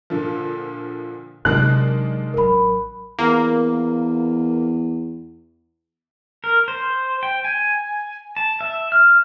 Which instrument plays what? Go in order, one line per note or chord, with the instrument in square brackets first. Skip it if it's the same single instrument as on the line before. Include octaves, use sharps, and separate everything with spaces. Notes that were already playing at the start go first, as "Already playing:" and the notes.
[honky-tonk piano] A#2 D3 F3
[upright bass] C3 F#3 [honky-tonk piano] D#3 G#3 D4 [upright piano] F#6
[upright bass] A1 F#3 [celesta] A#4 B5
[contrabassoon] E2 [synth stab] A#3
[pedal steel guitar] A#4
C5
G5
G#5
A5
E5
F6